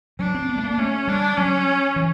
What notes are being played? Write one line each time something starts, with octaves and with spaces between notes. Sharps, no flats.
F#3 D4
C4
B3
A3
A#3
A3 C#4
G3 D4
F#3 C#4
E3